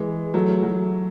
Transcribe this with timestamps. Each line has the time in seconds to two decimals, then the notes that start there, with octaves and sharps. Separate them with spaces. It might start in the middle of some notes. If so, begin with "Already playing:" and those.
Already playing: E3 G#3
0.34 F#3 A3
0.63 F#3